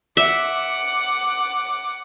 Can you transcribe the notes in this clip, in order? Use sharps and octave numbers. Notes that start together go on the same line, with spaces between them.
E5 F#5 D6